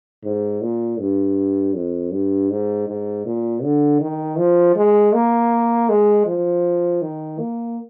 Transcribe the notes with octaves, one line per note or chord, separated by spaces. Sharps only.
G#2
A#2
G2
F2
G2
G#2
G#2
A#2
D3
D#3
F3
G#3
A#3
G#3
F3
D#3
A#3